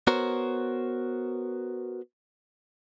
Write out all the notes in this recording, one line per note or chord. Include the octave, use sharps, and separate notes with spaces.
B3 F#4 A#4 C5 C#5